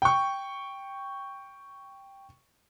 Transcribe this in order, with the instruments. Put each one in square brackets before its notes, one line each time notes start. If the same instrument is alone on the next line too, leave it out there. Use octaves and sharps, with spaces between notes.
[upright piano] G5 C#6